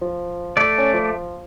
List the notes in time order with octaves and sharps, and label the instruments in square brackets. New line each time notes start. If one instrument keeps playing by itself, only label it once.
[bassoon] F3
[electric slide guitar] A3 D5
[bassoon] C#4
F3